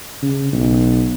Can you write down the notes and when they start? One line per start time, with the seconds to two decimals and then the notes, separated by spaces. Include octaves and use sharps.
0.22 C#3
0.53 B1